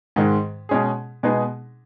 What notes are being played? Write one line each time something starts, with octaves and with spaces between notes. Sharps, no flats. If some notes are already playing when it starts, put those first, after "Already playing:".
G#2 D#3 G#3
B2 G#3 C#4 G#4
B2 G#3 B3 D#4 G#4